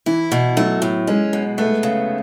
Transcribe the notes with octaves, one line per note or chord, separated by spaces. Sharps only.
E3 E4
B2
F#3 A3
A2
G#3 C#4
B2
A3 B3
C#3